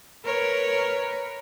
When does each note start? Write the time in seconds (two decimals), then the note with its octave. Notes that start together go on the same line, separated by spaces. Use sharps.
0.25 A#4 B4 C#5